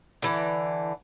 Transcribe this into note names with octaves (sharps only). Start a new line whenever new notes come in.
D3 E3